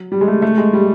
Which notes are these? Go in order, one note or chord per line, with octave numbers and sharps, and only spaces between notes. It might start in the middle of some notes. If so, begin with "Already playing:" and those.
Already playing: F#3
G3
G#3
A3
A3
G#3
G3